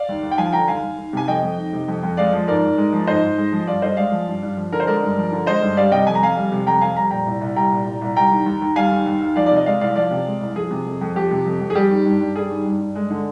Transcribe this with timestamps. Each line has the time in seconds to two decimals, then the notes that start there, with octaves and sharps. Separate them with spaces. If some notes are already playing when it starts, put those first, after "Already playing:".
Already playing: D5 F5
0.09 D#2
0.23 D#2
0.31 G5
0.38 F3 F5 G#5
0.53 D3 G5 A#5
0.68 D#2 F5 G#5
0.83 D#2
0.98 D#3
1.13 C3 G#5
1.28 F2 D#5 G5
1.43 F2
1.58 D#3
1.73 C3
1.88 F2
2.03 F2
2.17 G#3 D5 F5
2.33 F3
2.48 G#2 A#4 D5
2.63 G#2
2.78 G#3
2.93 F3
3.07 G#2 C5 D#5
3.22 G#2
3.38 G#3
3.52 F3
3.67 G2 D5 F5
3.82 G2 C5 D#5
3.97 G#3 D5 F5
4.12 F3
4.27 G2
4.42 G2
4.57 F3
4.72 D3 A#4
4.80 C5
4.87 G#3 A#4 D5
5.02 G2
5.17 F3
5.32 D3
5.46 G#3 C5 D#5
5.62 G2
5.77 G3 D5 F5
5.92 C3 D#5 G5
6.07 F2 G#5
6.15 A#5
6.22 F2 F5 G#5
6.37 G3
6.52 C3
6.67 F2 G5 A#5
6.81 F2 F5 G#5
6.96 G3 A#5
7.11 A#2 G5 A#5
7.26 C2
7.41 C2
7.56 G3 G5 A#5
7.71 A#2
7.86 C2
8.01 C2
8.16 G3 G5 A#5
8.31 D#3
8.46 D#2
8.62 D#2
8.76 G3 F5 G#5
8.92 D#3
9.06 D#2
9.21 D#2
9.36 F3 D5 F5
9.46 C3 D5
9.56 D#5
9.66 G#3 D5 F5
9.81 C2 D5 F5
9.96 F3 D5 F5
10.11 C3
10.26 G#3
10.41 C2
10.56 F3 G#4
10.71 C3
10.86 F2
11.01 F2
11.15 F3 G4
11.31 C3
11.46 F2
11.61 F2
11.70 G#4
11.75 G3 G4
11.90 D#3
12.06 G2
12.21 G2
12.35 G3 G#4
12.50 D#3
12.65 G2
12.80 G2
12.95 G#3
13.10 D3